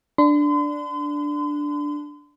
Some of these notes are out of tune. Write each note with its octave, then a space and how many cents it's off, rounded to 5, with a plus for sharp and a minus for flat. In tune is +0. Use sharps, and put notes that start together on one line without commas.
D4 +0 C6 -40